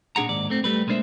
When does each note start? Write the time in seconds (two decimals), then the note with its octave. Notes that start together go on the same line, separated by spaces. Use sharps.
0.16 A#2 D4 G#4 F#5 A#5
0.29 D#2 G#2 D5
0.50 A3 C4
0.64 G3 A3 B4
0.87 B1 G#3 A#3 D4 C5 E5